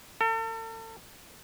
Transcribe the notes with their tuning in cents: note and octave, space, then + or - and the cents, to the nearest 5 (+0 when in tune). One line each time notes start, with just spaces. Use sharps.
A4 +40